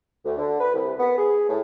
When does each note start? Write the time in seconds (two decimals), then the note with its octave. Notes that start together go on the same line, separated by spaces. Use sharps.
0.25 D2
0.38 D3
0.60 B4
0.74 C2
0.99 B3
1.18 G#4
1.49 A2